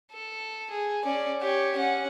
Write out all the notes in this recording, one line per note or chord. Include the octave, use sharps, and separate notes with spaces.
A4
G#4
C#4 D5
G4 C#5
C#4 F#5